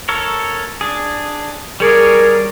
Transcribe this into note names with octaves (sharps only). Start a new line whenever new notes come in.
A4 A#4 C#5
D4 G#4
G3 G#4 A#4 C#5 D5